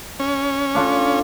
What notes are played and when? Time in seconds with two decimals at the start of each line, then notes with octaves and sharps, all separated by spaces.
0.20 C#4
0.75 D4 F4 A4